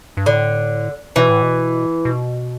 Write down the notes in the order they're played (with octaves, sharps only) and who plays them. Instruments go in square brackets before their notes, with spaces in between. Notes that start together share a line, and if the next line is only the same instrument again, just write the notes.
[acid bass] G2
[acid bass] A2 [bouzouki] D3
[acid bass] B2 [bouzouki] E3
[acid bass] A2
B2
B2